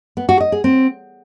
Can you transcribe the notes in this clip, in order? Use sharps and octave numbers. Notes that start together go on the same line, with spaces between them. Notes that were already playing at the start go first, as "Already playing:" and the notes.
B3
F#4
D#5
G#4
C4